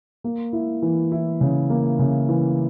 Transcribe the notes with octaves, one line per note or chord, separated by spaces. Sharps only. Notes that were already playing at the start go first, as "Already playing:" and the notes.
A#3
E4
E3
E4
C#3
A#3
C#3
E3